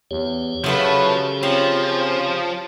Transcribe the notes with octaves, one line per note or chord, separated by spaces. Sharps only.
E2 G4 C#5
C#3 F3 F#3 A3 B4
F3 C4 C#4